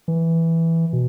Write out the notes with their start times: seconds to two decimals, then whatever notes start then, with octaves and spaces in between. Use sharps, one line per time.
0.08 E3
0.93 B2